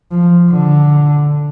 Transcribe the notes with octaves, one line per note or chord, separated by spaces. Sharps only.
F3
D3